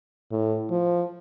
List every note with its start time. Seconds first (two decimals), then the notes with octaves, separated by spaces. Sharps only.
0.32 A2
0.70 F3